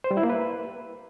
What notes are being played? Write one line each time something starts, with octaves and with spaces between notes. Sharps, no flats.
C5
G3
E4
A#3
B4